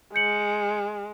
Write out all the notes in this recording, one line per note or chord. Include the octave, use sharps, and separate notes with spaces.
G#3 G6 C#7 F#7